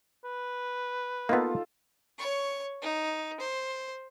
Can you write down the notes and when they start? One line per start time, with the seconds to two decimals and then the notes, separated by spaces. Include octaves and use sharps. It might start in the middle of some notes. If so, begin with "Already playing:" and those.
0.25 B4
1.29 A#3 B3 D#4 F4 A4
2.18 C#5 C#6
2.82 D#4
3.40 C5